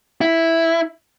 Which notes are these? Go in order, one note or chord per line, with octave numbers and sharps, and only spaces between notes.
E4